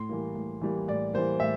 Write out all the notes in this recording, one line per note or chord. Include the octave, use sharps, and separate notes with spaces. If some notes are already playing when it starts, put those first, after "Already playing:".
Already playing: A2 C6
E3 G3 A#3
A2
E3 G3 A#3
A2 D5
E3 G3 A#3 C5
A2 E5